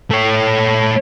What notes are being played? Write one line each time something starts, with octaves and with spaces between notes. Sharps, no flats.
A3 C#5